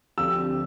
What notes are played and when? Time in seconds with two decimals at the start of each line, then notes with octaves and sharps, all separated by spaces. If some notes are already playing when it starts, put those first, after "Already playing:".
0.18 D2 D3 F3 C4 G4 E6